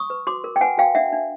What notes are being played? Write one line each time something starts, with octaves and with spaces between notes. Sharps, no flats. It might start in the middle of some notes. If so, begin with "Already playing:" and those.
Already playing: C#6 D#6
B4
F#4 C6 D6
A#4
G5
B4 F#5 G#5
F#4 F5 G5
D4 E5 F#5
D4